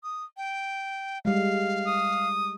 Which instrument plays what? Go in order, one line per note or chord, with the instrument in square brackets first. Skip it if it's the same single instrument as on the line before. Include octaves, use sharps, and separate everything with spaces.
[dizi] D#6
G5
[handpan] G3 G#3 [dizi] F5
[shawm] D#6